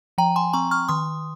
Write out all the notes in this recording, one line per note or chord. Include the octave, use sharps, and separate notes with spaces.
F3 G5 A#5
G#5 C6
C4 A#5 C#6
C#6 F6
D#3 C6 D#6